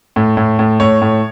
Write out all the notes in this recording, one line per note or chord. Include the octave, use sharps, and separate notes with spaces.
A2
A2
A2
A2 C#5
A2